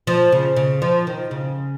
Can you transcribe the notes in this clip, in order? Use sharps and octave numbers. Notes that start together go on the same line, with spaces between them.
F3
C#3
C#3
F3
D#3
C#3